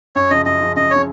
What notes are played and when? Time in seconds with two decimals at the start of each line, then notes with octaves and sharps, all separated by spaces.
0.16 F#2 C#5
0.30 C#3 F3 D#5
0.46 F#2 D#5
0.61 C#3 F3
0.76 F#2 D#5
0.91 C#3 F3 C#5